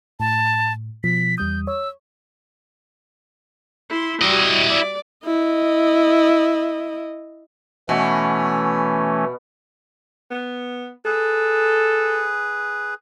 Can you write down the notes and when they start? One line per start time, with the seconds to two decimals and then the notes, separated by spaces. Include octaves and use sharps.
0.20 A2 A5
1.04 B2 F3 B6
1.38 E2 G3 D#6 G6
1.67 C#5 E6
3.90 E4 C6
4.22 G3 E4 F#4 D#5
4.67 D5
5.26 E4 D#5
7.89 B2 E3 A3 C#4
10.31 B3
11.05 G#4 A4 B4